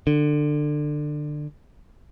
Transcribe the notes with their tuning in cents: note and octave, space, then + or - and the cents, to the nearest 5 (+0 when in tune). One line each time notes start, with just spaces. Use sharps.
D3 +20